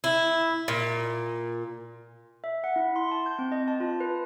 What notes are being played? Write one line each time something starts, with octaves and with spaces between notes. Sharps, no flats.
E4
A#2
E5
F#5
E4
C6
A5
G6
C4
D#5
A5
F4
B4